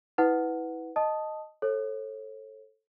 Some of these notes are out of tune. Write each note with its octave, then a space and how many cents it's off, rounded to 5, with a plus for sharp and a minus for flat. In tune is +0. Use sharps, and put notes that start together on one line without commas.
E4 -25 B4 +10 F#5 +0
D#5 -5 A5 +0 D#6 +0
A4 +0 C#5 -35